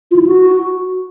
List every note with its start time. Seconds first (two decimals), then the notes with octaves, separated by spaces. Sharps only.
0.11 F4
0.16 E4
0.21 F4
0.27 F#4